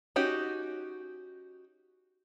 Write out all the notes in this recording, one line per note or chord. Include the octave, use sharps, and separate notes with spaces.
C#4 D#4 F#4 G4